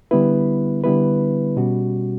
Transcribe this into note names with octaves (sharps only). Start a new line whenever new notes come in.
D3 G3 B3 E4 B4
D3 G3 B3 E4 B4
B2 G3 C#4 F#4